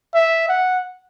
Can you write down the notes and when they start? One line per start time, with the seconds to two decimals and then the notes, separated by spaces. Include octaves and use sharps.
0.14 E5
0.49 F#5